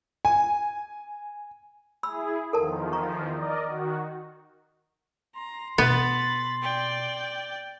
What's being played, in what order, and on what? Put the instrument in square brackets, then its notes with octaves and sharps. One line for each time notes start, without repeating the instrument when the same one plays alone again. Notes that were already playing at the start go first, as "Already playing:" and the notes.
[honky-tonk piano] G#5
[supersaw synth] E4 G#4 [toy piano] B5 E6
[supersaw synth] E2 D#3 F3 [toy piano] A4 A#4 A5
[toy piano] A#5 C#6
[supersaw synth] A#4 D5 D#5
D#3 F#4
[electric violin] A#5 [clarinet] C6
[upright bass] B2 [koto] B3 [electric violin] B5 A6
[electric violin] D5 G5